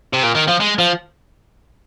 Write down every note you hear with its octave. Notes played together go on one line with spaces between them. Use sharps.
C3
A#2
D#3
F3
G#3
F3